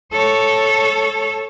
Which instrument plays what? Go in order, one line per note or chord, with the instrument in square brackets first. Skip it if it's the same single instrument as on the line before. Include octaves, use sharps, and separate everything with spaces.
[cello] A4 C#5